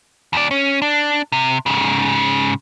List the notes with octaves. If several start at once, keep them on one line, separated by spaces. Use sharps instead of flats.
D#2 D5
C#4
D4
C3
G#2 C#3